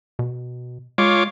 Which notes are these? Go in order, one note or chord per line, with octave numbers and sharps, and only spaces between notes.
B2
G#3 F4 C#5 D6